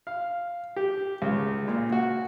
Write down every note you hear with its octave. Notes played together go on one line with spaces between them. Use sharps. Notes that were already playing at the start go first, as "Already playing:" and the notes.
F5
G4
C#2
A#2
F#4